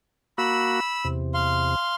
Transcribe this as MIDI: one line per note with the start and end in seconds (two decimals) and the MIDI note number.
0.38 0.80 58
0.38 0.80 66
0.38 1.07 83
0.38 1.07 88
1.04 1.75 40
1.04 1.75 48
1.34 1.95 77
1.34 1.95 84